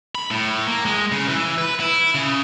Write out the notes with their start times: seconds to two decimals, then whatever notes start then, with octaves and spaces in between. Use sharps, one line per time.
0.15 B5
0.31 A2
0.67 A#3
0.85 G#3
1.12 C#3
1.29 E3
1.58 B4
1.80 E4
2.15 C#3